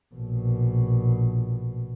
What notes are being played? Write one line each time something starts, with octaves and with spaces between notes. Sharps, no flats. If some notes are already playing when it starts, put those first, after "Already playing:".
A#1 B2